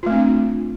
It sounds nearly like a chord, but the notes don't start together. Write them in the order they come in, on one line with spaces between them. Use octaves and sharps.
F4 A3 C4 D4